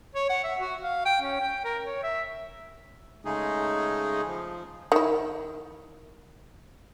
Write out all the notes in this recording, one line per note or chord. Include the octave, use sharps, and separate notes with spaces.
C#5
F#5
E5
F#4
F5
G5
C#4
G5
A#4
C#5
E5
C#3 G#3 A3 D#4 G#4
F3
D#3 E4